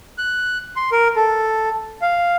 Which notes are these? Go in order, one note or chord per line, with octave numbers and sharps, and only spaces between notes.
F#6
C6
A#4
A4
F5